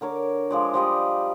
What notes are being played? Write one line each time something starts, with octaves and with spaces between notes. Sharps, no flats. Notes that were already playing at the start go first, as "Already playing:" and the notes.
D3 A#4 C#5 D6
F3 G#3 D5
F3 G3 D5 D#5